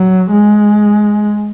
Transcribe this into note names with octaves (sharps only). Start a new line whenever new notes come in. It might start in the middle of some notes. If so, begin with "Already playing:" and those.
Already playing: F#3
G#3